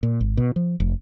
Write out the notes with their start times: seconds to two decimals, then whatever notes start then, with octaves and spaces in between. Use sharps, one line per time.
0.03 A#2
0.21 G#1
0.37 B2
0.56 F3
0.80 F1